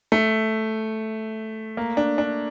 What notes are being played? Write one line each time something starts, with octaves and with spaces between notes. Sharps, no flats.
A3
A#3
D4
D4